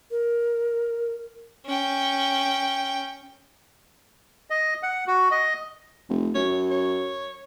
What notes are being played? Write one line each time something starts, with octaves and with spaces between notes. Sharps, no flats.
A#4
C#4 G5
D#5
F#5
F#4
D#5
F1
F#2 C#5
C#5